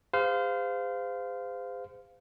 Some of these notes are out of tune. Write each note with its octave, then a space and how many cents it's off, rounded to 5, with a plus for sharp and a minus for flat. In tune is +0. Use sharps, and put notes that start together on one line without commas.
G#4 -40 C5 -30 F5 +0